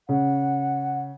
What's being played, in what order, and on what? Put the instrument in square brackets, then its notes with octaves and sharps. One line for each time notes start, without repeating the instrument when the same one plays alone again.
[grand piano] C#3 [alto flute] F#5